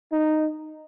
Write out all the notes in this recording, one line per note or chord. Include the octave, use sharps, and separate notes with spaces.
D#4